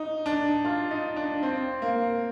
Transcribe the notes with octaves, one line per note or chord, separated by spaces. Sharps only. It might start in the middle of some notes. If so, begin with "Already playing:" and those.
Already playing: D#4
D4
F4
D#4
D4
C4
A#3